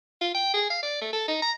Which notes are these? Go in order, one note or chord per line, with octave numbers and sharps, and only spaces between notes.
F4
G5
G#4
F5
D5
A3
A4
D#4
A#5